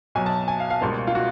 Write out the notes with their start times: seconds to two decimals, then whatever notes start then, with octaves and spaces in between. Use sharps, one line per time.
0.15 B1 B2 F#3 G#5
0.26 A5
0.48 G#5
0.60 F5
0.70 F5
0.81 C#2 B2 G3 A#3 C5
1.07 F4
1.15 F#4